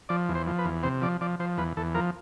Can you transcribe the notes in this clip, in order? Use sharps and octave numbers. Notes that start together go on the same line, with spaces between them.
F3 D5
E2
C5
F3
B4
E2
C3 C5
F3 D5
F3 D5
F3 C5
E2 B4
E2 A4
F3 A#4